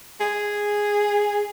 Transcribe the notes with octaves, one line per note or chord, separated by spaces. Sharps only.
G#4